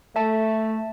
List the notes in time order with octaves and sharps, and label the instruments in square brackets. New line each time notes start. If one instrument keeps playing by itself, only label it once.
[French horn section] A3 [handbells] E5 A5